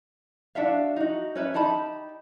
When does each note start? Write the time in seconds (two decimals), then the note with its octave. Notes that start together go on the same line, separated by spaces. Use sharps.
0.55 D4 F#4 E5 F5
0.96 D#4 F#4
1.35 C#4 B4 E5
1.54 D#4 G4 A5 B5